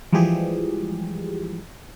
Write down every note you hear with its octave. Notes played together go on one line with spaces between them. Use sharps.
E3 F3 G3 G#3 G4 G#4